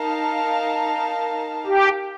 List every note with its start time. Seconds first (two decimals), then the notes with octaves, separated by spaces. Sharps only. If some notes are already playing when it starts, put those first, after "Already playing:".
Already playing: D#4 A#4 F5 A5
1.66 G4